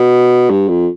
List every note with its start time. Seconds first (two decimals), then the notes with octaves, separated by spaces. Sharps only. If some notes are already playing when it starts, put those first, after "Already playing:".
Already playing: B2
0.50 G2
0.68 F2